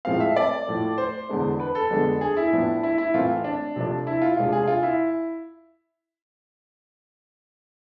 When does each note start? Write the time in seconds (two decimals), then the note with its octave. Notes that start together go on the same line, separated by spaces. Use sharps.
0.05 A2 F3 G#3 C4 F5
0.20 E5
0.36 D5
0.67 A2 F3 A3
0.98 C5
1.29 E2 D3 G#3 B3 D4
1.60 B4
1.75 A4
1.91 F2 D3 G#3 B3 D4
2.21 G#4
2.37 E4
2.52 A2 F3 B3 D4
2.83 E4
2.98 E4
3.14 A2 E3 A3 C4 F4
3.44 D4
3.76 C3 F3 A3 D4
4.07 E4
4.22 F4
4.37 C3 G#3 D4 F4
4.52 G#4
4.68 F4
4.83 E4